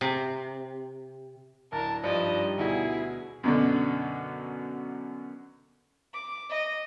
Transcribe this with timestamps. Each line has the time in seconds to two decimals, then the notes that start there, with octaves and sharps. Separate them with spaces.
0.01 C3
1.72 D1 D4 A#4 A5
2.03 G2 F3 G3 D#4 D5 D#5
2.58 D2 B2 E4 G#4
3.44 F#2 B2 D3
6.13 D6
6.50 D#5